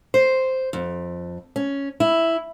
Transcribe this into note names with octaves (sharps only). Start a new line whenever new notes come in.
C5
F2
C#4
E4